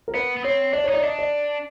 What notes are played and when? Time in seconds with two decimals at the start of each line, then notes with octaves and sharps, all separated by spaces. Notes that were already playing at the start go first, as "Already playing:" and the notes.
0.08 A#4
0.14 B3 B4
0.37 B3
0.44 C4 C#5
0.73 D4 D5
0.84 C#5
0.88 D#4
0.94 D5
1.03 D4 D#5
1.19 D5